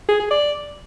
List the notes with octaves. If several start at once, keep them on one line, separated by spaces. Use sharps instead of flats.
G#4
G#4
D5